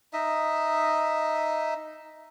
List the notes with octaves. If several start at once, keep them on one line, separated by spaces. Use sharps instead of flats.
D#4 D#5 E5